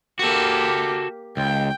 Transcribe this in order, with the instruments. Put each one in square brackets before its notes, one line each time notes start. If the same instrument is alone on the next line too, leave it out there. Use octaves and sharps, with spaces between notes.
[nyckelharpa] A#3 G4 [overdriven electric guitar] F#4 A4
[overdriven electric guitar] C#2 [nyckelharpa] G5